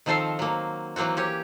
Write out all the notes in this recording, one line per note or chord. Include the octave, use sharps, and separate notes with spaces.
D#3 F3 C4 A4 C5 F5
F#3 A#3
E3 F#3 A#3 C4 F#4
C#4 G4 C#5